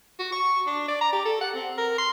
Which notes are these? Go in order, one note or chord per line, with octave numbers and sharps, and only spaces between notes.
F#4
C#6
D4
D5
A#5
G4
A4
F#5
C4
A#4
C6